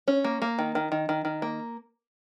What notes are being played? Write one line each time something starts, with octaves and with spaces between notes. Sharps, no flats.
C#4
A#3
A#3
D#3
D#3
D#3
D#3
D#3
A#3